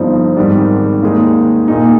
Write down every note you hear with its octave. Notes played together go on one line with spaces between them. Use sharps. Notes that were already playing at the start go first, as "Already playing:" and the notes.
Already playing: G1 G2 F3 C4 D#4
G#1 G#2 D#3 G3
D#2 D#3 G#3 D#4 G#4
A#1 A#2 G#3 D#4